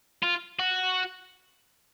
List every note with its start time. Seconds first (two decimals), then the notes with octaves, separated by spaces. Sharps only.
0.23 F4
0.60 F#4